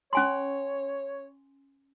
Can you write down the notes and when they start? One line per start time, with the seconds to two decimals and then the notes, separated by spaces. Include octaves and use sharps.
0.13 C#4 C#5 G#5 C6